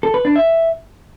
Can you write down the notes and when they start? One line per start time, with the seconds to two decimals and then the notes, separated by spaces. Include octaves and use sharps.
0.03 A4
0.14 B4
0.25 D4
0.36 E5